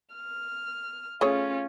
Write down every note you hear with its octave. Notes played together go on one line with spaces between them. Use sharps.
F6
A3 C#4 F4 G#4 C#5